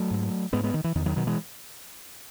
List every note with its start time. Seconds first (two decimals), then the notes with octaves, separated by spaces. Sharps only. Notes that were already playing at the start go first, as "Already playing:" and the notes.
Already playing: F#3 A3
0.11 G#2
0.53 G#2 G#3 B3
0.63 G#3 B3
0.74 D#3
0.84 E3
0.95 E2 D#3
1.06 D#3 F#3
1.16 B2 D#3 F#3
1.27 E3 G#3